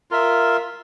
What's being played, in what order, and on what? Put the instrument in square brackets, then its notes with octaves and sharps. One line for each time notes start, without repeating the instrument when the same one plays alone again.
[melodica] F4 A#4 E5